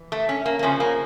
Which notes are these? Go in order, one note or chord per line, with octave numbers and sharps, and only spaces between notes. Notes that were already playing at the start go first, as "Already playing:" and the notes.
Already playing: E3
A3
C#4
A#3
A#3
F2 C#3 F3 C#4
A#3